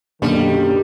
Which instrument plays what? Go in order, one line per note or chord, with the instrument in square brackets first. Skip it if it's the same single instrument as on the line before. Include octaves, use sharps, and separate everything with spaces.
[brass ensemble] F#2 D#3 [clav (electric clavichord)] B2 D3 [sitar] G3 [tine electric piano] A#3 D4 A4